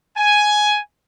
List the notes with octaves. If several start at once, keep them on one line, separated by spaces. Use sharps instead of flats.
G#5